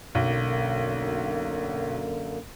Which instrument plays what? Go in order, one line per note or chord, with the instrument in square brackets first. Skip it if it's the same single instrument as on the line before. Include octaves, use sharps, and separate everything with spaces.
[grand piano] B1 [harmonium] F#2 D3 A#3